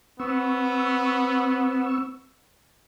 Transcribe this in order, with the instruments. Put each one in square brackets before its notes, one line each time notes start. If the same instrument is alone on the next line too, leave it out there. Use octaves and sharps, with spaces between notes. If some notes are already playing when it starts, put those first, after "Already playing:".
[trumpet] B3 [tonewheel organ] C4 C#6 E6